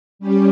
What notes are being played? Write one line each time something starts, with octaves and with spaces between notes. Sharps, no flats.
G3 C#4 G4